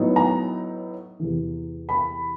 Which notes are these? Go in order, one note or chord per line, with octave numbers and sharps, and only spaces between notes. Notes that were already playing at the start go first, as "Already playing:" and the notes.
Already playing: A2 F#3 B3 D#4
A#5
E2 C3 E3
B5